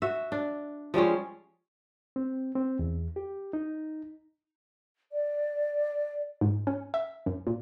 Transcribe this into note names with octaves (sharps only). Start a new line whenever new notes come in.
F#4 E5
D4
F3 G3 G#3 C#4
C4
C4
E2
G4
D#4
D5
G#2
C#4
E5
F#2
A#2